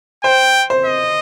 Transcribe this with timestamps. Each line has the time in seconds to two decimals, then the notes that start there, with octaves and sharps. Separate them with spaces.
0.24 C5 G5
0.70 C5
0.85 D#5